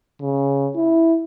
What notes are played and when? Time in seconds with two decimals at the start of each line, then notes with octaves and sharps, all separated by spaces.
0.21 C#3
0.75 E4